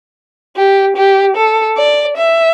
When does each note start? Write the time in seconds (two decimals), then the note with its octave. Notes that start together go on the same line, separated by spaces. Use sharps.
0.56 G4
0.97 G4
1.36 A4
1.77 D5
2.17 E5